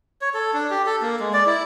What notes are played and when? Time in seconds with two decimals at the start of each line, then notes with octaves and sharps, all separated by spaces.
0.21 C#5
0.34 A4
0.54 D4
0.70 G4
0.86 A4
1.02 A#3
1.20 G#3
1.33 D5
1.46 E4